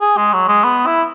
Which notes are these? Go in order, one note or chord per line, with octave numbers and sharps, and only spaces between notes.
G#4
G#3
F#3
G#3
B3
E4